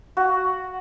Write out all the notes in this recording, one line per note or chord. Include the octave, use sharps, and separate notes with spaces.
F#4